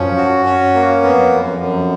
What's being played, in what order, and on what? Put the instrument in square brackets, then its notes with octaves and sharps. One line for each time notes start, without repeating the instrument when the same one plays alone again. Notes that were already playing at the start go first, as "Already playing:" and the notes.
Already playing: [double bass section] F#2 [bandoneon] F3 C#4
[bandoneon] F#4
C#4
A#3
[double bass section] F2 [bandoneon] B3
[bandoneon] F#2
F#2